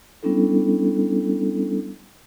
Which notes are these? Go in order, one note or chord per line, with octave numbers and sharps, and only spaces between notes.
G3 B3 C#4 D4 E4 A4